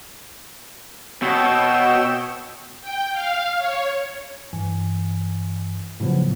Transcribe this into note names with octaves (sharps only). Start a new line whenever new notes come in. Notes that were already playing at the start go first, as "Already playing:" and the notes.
B2 C#5 G5 E6
G5
F5
C#5
G2 E3 G#5
A2 C#3 F3 F#3 B3